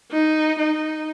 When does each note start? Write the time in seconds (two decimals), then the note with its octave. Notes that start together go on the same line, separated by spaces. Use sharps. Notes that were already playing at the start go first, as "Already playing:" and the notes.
0.12 D#4
0.58 D#4